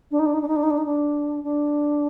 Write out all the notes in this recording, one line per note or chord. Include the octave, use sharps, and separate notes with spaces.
D4
D#4
D4
D#4
D4
D#4
D4
D#4
D4
D#4
D4
D4